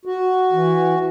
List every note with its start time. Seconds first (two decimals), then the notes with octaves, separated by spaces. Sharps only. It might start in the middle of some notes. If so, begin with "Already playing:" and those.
0.05 F#4
0.52 E3